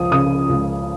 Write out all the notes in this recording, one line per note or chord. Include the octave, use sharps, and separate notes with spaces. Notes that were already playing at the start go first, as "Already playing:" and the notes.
Already playing: C#2 F3 D#6
C#3 D#6
C#2